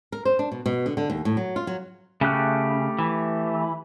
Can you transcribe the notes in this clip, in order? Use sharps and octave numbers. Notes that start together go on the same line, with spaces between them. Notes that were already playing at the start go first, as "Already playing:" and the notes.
A#4
C5
D4
B2
B2
D3
D3
D#2
A2
F#3
F4
F#3
C#3 A3 G4 F#6
E3